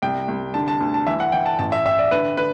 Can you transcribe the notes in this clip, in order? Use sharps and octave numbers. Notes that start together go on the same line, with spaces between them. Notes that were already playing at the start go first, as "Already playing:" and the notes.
C2 G5
C2
D3 A5
A5
D2
A5
E3 E5
F#5
E3 G5
A5
A1 A5
E5
A1 E5
D5
D3 B4
D3 B4